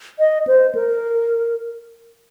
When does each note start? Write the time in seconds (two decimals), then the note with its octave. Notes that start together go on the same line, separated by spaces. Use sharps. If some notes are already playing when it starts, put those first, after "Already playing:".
0.19 D#5
0.47 C5
0.75 A#4